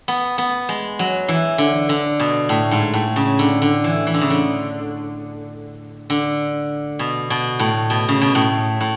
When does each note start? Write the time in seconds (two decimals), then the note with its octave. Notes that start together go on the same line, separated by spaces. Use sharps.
0.08 B3
0.38 B3
0.69 G#3
0.99 F#3
1.28 E3
1.58 D3
1.89 D3
2.20 B2
2.49 A2
2.71 G#2
2.93 A2
3.16 C#3
3.39 D3
3.62 D3
3.84 E3
4.07 E3
4.14 D3
4.21 C#3
4.30 D3
6.10 D3
6.99 B2
7.30 B2
7.59 A2
7.90 B2
8.09 C#3
8.21 B2
8.35 A2
8.81 A2